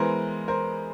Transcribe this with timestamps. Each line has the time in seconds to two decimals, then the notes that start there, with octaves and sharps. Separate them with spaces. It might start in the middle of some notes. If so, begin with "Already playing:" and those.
Already playing: E3 G#3 B3 A#4 C5
0.48 A#4 C5